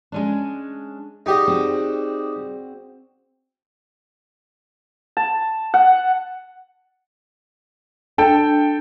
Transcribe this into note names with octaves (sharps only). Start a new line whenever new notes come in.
G#3 C#4 D4
D#4 G4 G#4 D5 D#5 F#5
C4 F#4
A5
F#5
D4 A4 G5